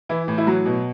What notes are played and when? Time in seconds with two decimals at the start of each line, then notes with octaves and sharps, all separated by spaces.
0.09 E3 E4
0.28 A2
0.38 E4
0.47 F#3 F#4
0.66 B2